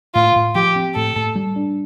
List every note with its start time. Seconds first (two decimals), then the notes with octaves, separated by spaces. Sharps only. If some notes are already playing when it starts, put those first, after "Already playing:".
0.15 A2 F4
0.36 A2
0.55 F3 G4
0.76 C4
0.95 A2 A4
1.16 A2
1.36 G3
1.56 D4